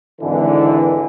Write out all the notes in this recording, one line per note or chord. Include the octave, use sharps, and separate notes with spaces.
G#1 D3 E3